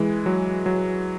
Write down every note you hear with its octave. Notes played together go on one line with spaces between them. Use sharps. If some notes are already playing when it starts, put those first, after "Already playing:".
Already playing: E3 G#3
F#3
F#3